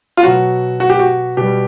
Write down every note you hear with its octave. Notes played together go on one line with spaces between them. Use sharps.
F4
B2 F#3 F#4
F#4
G4
F#4
B2 G3 G4